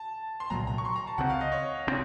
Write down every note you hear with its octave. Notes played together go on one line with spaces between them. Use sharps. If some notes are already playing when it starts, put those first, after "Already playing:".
Already playing: A5
C6
C2 A#2 F#3 A#3 A#5
A#5
C#6
C6
A#5
A5
C#2 C#3 A3 C4 F#5
F5
D#5
C#5
C3 F3 C4